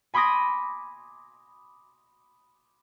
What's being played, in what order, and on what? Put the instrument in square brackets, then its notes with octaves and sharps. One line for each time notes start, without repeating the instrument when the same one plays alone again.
[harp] G#5 B5 C6 D6 D#6 A#6